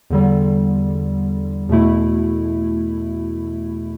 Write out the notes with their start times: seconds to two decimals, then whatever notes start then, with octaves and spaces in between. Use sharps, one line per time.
0.10 E2 D3 G3
1.69 E2 B2 A3 E4